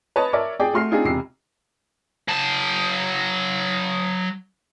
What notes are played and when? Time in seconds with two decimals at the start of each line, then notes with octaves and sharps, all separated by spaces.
0.16 B4 C#5 D#5 A5
0.33 A#4 C#5 D5 E5
0.60 G#4 D5 G5
0.74 A3 F#4 C6 F6 C7
0.91 C4 D4 D#4 F4 G#4
1.04 E1 C3 C7
2.28 F#3 A5